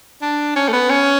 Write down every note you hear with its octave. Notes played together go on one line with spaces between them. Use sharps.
D4
C#4
A3
B3
C#4